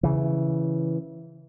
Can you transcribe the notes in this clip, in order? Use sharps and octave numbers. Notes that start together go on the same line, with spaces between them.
C#3 E3